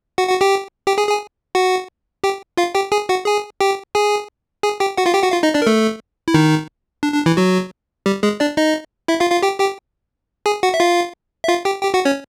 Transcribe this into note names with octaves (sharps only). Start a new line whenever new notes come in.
F#4 F#5
F#4 F#5
G4 G5
G4 G5
G#4 G#5
G#4 G#5
F#4 F#5
G4 G5
F4 F5
G4 G5
G#4 G#5
F#4 F#5
G#4 G#5
G4 G5
G#4 G#5
G#4 G#5
G4 G5
F#4 F#5
F4 F5
G4 G5
F#4 F#5
F4 F5
D#4 D#5
D4 D5
A#4
A3 A4
E4
D#3 D#4
D4
D4
E3 E4
F#3 F#4
G3 G4
G#3 G#4
D4 D5
D#4 D#5
E4 E5
F4 F5
F4 F5
G4 G5
G4 G5
G#4 G#5
F#4 F#5
E5
F4 F5
E5
F4 F5
G4 G5
G4 G5
F#4 F#5
C#4 C#5